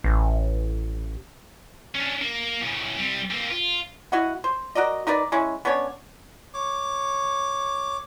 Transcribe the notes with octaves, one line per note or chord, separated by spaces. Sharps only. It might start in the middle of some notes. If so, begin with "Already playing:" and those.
A1
C#4 D4
A#3
A2 C#3
G3 C4
A#3 C4
F4
E4 F#4 D#5 F#5
C5
F#4 A#4 D5 D#5
D#4 A#4 B4 D5
G#3 C#4 E4
B3 C#4 D4 C#5
C#5 D6